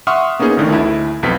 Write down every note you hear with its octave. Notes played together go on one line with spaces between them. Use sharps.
E5 F#5 C6 C#6 D#6 F6
A#3 B3 C#4 D#4 G#4
A1 A2 D3 D#3
D2 E4
B1 F2 B3 B6